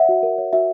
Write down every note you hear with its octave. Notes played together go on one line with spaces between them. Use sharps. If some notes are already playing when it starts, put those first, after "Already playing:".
Already playing: C#5 E5 F#5
F#4
A#4
C#5
F#4 E5